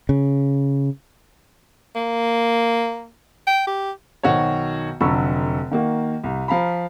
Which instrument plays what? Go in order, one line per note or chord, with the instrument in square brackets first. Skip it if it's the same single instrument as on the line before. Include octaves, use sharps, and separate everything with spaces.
[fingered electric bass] C#3
[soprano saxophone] A#3
G5
G4
[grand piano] B1 D#3 F#4 C5 C#5
F1 D3 F#3 B5 C#6 E6
D#3 A#3 F#4
C2
F3 F5 A#5 B5